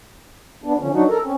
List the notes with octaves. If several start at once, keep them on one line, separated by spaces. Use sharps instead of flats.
B3 D4
D3 F3 C#4
F#3 D4 D#4 F#4
A4 A#4
C4 C#4